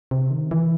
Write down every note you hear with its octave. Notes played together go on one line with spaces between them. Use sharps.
C3
D#3
E3